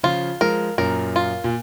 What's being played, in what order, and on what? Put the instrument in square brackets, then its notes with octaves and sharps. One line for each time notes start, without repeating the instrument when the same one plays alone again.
[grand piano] C#3 F3 [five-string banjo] F4
[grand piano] F3 G#3 [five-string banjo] A#4
[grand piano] F#2 A#2 [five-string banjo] A#4
[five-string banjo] F4
[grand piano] A#2